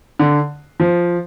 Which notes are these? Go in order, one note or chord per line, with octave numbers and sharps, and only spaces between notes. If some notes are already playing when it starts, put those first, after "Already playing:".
D3
F3